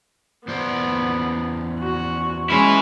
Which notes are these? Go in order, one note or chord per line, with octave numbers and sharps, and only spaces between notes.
E2 B3 C5 D5
F#4
E3 G#3 C#4 E4